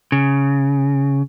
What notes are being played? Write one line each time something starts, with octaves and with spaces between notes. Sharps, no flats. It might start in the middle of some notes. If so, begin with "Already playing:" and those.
C#3